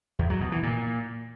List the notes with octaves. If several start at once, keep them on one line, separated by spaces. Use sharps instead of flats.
E2
F#3
B2
E3
A#2